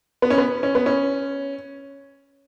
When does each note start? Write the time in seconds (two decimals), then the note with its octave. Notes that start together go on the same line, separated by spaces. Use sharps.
0.22 B3
0.30 C#4
0.38 B3
0.63 C#4
0.75 B3
0.86 C#4